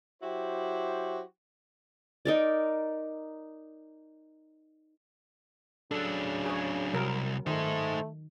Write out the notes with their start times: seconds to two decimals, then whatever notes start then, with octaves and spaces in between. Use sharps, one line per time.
0.22 F#3 E4 F#4 G4 C5
2.25 D#4 A#4 D5
5.91 C#3 F#3 D4 A4
6.46 G#4 C#5
6.94 C2 F#3 A#4
7.47 D#3 A3 D#4 C5